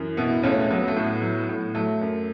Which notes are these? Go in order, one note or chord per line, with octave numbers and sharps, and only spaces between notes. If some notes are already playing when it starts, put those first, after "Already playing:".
Already playing: F#2 E3
B2 B3 E4
C#2 A3 C#4
F#3 B3
A3
A2
B3
F#3
A2
F#3 A3
F#2